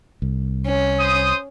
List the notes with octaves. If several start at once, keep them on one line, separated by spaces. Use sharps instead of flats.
C2
C#4
C5 C6 D#6